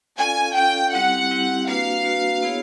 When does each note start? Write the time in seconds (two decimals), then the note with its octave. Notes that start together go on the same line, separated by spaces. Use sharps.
0.18 C#4 F4 A4 D5 F5 G#5
0.55 C#4 F4 A4 D5 F5 G5
0.93 G3 C4 E4 G4 F#5
1.31 G3 C4 E4 G4
1.68 A#3 D4 F#4 B4 F5
2.05 A#3 D4 F#4 B4
2.43 B3 E4 G#4 C#5